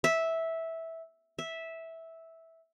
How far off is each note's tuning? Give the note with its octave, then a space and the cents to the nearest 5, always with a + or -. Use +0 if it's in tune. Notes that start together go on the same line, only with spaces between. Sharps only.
E5 -10
E5 -10